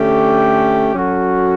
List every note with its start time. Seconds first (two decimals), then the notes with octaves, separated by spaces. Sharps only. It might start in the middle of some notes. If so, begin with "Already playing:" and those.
Already playing: D3 A3 C#4 G4
0.93 F#3 C#4 F#4 A4